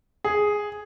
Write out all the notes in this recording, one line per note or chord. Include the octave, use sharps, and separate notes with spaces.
G#4